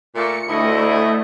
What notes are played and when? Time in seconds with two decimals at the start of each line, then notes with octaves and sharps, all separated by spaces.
0.15 A#2 A3 C#7
0.49 D2 A3 E4 D#5